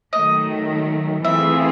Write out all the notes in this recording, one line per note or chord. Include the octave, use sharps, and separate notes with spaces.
D#3 F#3 A3 D#5
E3 A3 C4 F4 G#4 E5